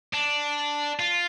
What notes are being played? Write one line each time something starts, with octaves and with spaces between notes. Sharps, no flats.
D4
F4